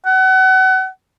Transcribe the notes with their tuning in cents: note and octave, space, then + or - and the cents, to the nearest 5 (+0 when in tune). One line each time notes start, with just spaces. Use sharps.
F#5 +30